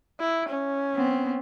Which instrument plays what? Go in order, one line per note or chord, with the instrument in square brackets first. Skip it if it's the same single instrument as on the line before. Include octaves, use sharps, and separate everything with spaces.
[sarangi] E4
C#4
[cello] B3 C4